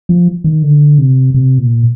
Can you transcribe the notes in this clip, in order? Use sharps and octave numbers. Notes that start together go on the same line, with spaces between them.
F3
D#3
D3
C3
C3
A#2